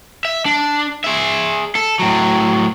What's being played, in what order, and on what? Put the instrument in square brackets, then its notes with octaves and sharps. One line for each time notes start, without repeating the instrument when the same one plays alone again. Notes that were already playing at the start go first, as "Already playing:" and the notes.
[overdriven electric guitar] E5
D4
G#4 E5
A4
A2 F#3